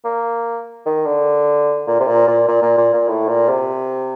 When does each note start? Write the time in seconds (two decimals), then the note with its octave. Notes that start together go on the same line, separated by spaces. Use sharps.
0.05 A#3
0.86 D#3
1.06 D3
1.87 A#2
2.00 C3
2.07 A#2
2.27 A#2
2.48 A#2
2.62 A#2
2.77 A#2
2.93 A#2
3.08 A2
3.28 A#2
3.49 C3